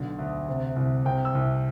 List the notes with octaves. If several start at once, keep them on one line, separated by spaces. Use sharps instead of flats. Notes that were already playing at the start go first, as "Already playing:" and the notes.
Already playing: B1 D3
D2
C3
C2
C3 G5
E6
C2